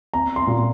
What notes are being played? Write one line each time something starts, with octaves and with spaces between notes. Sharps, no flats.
C4 A#5
C6
A#2